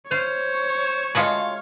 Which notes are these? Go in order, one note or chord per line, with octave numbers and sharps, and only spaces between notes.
F4 C5 C#5
C#3 G#3 A3 F4 F#4 B4